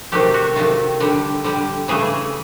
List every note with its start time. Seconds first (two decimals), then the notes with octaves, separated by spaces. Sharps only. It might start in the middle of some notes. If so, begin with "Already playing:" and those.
0.12 C3 D#3 F#3 A3 G4
0.34 F#4
0.56 C3 D#3 F#3 A3 F4
1.00 D3 G3
1.44 D3 G3
1.88 C#3 E3 A3 G#4